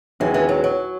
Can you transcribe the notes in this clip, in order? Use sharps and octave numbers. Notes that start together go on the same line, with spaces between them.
D#2 D#3 E3 G#3 C#4 F#4
E3
F#3
F#3